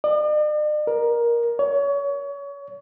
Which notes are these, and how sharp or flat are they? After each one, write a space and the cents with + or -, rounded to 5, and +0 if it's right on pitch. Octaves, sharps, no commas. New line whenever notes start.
D5 +45
A#4 +15
C#5 +30